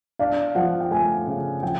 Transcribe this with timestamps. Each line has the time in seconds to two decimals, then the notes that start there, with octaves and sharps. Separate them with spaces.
0.19 D4 F5
0.55 F3 F#5
0.80 G5
0.91 A3 G#5
1.27 C#3
1.62 F3 G5